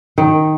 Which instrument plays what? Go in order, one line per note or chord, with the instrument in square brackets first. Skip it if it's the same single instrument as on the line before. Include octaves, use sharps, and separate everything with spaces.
[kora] D#3